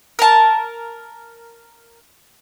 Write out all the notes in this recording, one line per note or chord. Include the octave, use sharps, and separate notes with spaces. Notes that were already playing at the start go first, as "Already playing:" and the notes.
A#4 A5